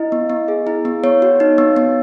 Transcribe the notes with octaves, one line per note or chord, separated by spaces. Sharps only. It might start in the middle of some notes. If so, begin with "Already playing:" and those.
Already playing: E4 D#5
B3
B3
G#4
E4
B3
B3 C#5
F#4
D#4
B3
B3